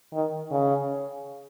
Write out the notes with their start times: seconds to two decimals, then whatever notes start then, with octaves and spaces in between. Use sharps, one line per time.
0.13 D#3
0.51 C#3